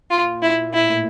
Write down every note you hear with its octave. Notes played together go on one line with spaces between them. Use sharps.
A#2 F4
E4
A2 E4